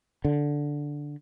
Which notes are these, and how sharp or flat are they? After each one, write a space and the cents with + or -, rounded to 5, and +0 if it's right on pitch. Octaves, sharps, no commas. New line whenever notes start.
D3 -5